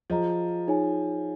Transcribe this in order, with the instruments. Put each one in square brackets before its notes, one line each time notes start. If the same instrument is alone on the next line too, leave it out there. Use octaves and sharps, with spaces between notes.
[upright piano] F3 [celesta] G#4 D#5 A#5
[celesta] D#4 G#4 C#5 G#5